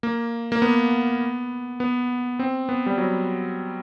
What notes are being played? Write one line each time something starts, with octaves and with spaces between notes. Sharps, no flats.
A#3
A#3
B3
B3
C4
B3
G3
F#3